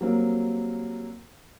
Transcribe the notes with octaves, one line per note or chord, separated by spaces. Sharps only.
F#3 G3 A#3 C4